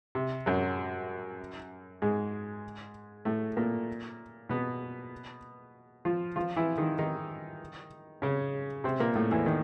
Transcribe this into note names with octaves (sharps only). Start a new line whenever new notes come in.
C3
F#2 F#3
G#2 G#3
A2 A3
A#2 A#3
B2 B3
F3 F4
F3 F4
E3 E4
D#3 D#4
D#3 D#4
C#3 C#4
C3 C4
A#2 A#3
A2 A3
E2 E3
D#3